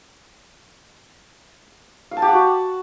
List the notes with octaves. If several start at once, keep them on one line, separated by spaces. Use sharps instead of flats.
F5
A5
G4
F#5
F#4